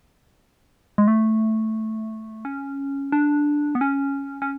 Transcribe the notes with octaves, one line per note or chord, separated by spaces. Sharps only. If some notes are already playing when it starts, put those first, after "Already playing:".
G#3
A3
C#4
D4
B3
C#4
C#4